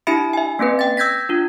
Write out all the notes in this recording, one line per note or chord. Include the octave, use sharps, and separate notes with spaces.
D4 E4 G4 E5 B5 C#7
E5 G#5
A#3 C4 C#4 B4
G5 A6
E6 G6 G#6 A#6 B6
D4 F4